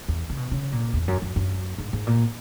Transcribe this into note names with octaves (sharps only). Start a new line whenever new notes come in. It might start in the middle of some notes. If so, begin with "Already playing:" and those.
E2
C#3
B2
C#3
A#2
E2
F#2
F#2
F#2
G#2
G#2
A#2